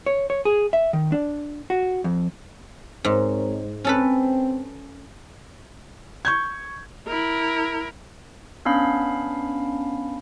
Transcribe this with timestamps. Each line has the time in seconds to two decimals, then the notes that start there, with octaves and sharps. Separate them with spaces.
0.06 C#5
0.30 C#5
0.45 G#4
0.73 E5
0.93 D#3
1.12 D4
1.70 F#4
2.04 F2
3.05 G#2 C4 A#4 C#5
3.85 C4 C#4 A4 B4
6.25 C#6 G6 G#6
7.07 E4 A#4
8.65 B3 C#4 D4 F5 B5